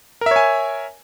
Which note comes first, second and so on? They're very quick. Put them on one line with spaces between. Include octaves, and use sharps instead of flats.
A#4 E5 C#5 G#5